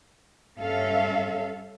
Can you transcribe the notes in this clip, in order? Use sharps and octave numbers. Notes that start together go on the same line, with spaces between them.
G2 C#4 A4 E5 F5